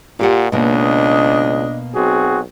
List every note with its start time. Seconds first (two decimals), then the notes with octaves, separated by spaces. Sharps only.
0.19 A#2 F4 G4 F#5
0.52 C#2 B2 A#3 D4 D#5
1.94 B1 C4 F#4 G#4